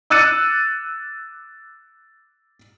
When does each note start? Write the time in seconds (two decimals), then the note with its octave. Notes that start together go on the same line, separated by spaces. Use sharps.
0.10 D6 E6 F#6 A6 C#7 D#7